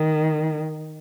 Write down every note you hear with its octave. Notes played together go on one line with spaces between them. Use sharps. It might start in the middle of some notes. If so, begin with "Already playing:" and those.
Already playing: D#3